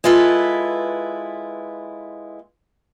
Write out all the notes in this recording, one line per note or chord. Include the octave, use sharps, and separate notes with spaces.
G#3 E4 F4 A4 B4